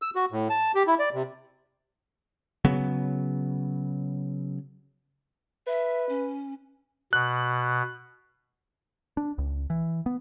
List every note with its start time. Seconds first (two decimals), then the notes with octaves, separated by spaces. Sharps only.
0.02 E6
0.15 F#4
0.32 A2
0.50 A5
0.75 G4
0.87 E4
0.99 D5
1.14 C3
2.65 C#3 F#3 B3
5.67 B4 E5
6.09 C#4
7.13 B2 F#6
9.17 D4
9.38 C#2
9.70 E3
10.06 B3